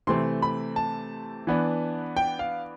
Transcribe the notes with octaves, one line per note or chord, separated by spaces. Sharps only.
C3 E3 A3 C4 C6
B5
A5
E3 B3 D4
G5
F5